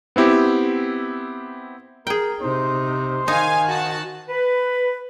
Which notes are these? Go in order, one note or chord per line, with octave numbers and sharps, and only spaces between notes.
B3 C4 E4 G4
G#4 A#4 G5
C3 D#4 C5
D#3 D#4 F5 G#5
F#4 A5
B4